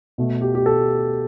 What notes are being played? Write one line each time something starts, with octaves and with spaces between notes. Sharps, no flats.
B2 A3
G4
G4
A4